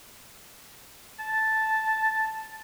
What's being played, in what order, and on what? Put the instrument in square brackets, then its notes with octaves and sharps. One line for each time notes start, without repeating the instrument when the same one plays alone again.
[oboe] A5